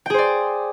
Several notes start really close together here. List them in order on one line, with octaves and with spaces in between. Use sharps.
G5 G#4 C5 D5